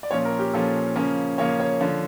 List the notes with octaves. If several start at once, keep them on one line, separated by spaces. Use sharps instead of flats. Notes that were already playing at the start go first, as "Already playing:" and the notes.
D5
A#2 F3 C#4 C#5
A#4
G4
A#2 F3 C#4 A4
C#3 F3 A#3 C#4
C#3 F3 A#3 C#4 C#5
C#5
D3 F3